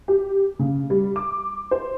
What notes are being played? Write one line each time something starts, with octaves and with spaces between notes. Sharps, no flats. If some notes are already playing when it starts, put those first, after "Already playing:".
G4
C#3
G3
D6
C5